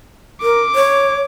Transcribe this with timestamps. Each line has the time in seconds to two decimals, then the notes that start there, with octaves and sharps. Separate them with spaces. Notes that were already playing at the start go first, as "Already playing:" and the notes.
0.42 A#4 D6
0.75 C#5